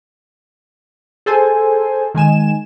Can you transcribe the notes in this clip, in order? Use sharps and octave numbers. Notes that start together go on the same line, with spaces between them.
G#4 A4 C5 G#5
D#3 G#3 G#5 E7